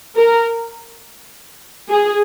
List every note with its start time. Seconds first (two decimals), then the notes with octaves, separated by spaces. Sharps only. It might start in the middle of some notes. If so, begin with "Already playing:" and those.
0.17 A#4
1.89 G#4